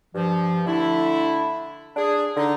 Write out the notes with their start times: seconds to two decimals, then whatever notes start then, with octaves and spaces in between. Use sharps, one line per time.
0.14 G2 F3
0.66 D3 A3 D4 E4
1.97 D4 G#4
2.36 D3 D#4